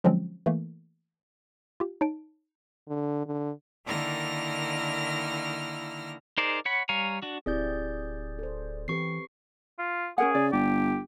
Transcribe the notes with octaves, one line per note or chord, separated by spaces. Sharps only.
D3 F3 F#3 G#3 C4 C#4
E3 A3 A#3
F4 G4
D#4 C#5 A5 D7
D3
D3
D3 D#3 A#3 E4 F6 A#6
D#4 G#4 A#4 C5 D5
C#5 F#5 B5
G3 C#5 F5 G#5 A#5
D4 F#4
D1 C4 E4 G4 G#4 D5 G6
A4 C5
E3 C4 G4 B4 C#6 C7
F4
C#4 G#4 A#4 F#5
C#3 D5
G1 G4